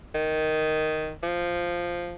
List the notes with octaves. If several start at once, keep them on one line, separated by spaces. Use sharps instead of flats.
D#3
F3